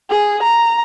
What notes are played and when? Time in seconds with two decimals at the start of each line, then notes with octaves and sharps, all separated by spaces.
0.10 G#4
0.43 A#5